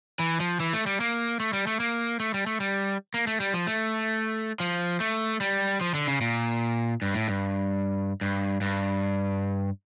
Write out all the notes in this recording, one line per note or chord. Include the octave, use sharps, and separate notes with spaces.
E3
F3
E3
A3
G3
A#3
A3
G3
A3
A#3
A3
G3
A3
G3
A#3
A3
G3
F3
A3
F3
A3
G3
F3
D3
C#3
A#2
G2
A2
G2
G2
G2